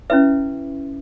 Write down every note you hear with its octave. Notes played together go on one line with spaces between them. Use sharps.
C#4 E4 B4 E5